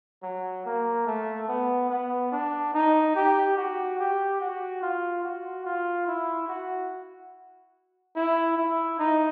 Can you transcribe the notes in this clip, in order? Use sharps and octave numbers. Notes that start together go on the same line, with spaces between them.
F#3
A#3
A3
B3
B3
D4
D#4
G4
F#4
G4
F#4
F4
F#4
F4
E4
F#4
E4
E4
D#4